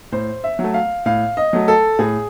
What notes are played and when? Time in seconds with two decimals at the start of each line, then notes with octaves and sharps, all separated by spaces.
0.12 A2 C5
0.44 E5
0.59 F#3
0.64 A3
0.74 F5
1.06 A2 F5
1.37 D#5
1.53 F#3 A3
1.68 A4
1.99 A2 G#4